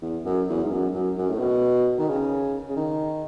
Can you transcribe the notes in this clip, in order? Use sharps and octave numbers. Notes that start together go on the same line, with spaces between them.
E2
F#2
E2
G#2
F#2
F#2
F#2
A2
B2
D#3
C#3
C#3
D#3